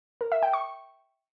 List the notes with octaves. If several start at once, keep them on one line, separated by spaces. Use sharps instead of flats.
A#4
E5
G5
C#6